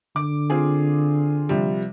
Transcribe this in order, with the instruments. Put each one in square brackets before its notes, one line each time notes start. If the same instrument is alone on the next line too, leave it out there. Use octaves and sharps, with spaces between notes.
[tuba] D3 [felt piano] D6
[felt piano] C4 F4 G#4
C3 F3 G3